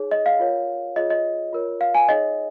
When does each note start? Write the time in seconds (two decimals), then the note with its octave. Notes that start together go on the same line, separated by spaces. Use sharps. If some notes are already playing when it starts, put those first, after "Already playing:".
Already playing: D#4 G#4 C#5
0.11 D#5
0.26 F5
0.39 F4 A#4 C#5
0.96 F4 G#4 C#5 D#5
1.10 D#5
1.53 F4 A#4 C#5
1.81 F5
1.95 G#5
2.09 D#4 G#4 C#5 D#5